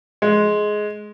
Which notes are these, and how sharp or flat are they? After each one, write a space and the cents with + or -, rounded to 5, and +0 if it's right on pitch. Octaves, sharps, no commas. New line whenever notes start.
G#3 +10